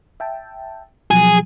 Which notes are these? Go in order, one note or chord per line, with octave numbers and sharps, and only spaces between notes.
E5 G5 A5
B2 F3 F#3 G#4